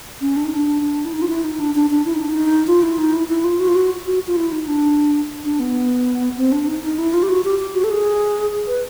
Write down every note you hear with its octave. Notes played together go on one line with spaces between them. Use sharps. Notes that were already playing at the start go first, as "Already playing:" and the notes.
C#4
D4
D#4
D4
E4
D#4
F4
E4
D#4
D4
D4
D4
E4
D#4
D4
D#4
F4
E4
D#4
E4
E4
F4
F#4
F4
F#4
F#4
F4
E4
D#4
D4
D4
B3
C4
D4
D#4
D#4
E4
F4
G4
F#4
G4
G4
F#4
A4
G#4
B4